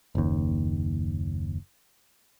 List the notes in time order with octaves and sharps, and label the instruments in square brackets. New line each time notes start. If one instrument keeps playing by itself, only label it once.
[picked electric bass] F#1 D#2